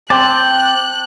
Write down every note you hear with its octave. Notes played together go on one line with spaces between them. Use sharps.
C4 G5 A5 D6 F#6